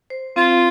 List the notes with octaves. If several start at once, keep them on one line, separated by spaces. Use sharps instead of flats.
C5
C4 F4